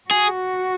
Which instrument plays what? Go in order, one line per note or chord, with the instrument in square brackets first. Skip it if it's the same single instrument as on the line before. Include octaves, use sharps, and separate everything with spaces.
[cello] F#4 [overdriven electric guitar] G#4